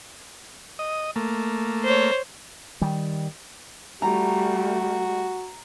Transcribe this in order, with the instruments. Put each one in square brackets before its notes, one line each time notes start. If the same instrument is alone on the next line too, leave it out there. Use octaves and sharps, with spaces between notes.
[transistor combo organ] D#5
A3 A#3
[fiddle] C5 C#5
[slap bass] D#3 G3
[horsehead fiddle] G3 A3 [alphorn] F#4 [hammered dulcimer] A#5